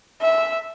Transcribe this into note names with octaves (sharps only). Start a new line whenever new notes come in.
E5